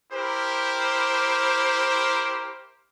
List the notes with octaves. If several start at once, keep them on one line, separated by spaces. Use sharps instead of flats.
E4 G4 A#4 C5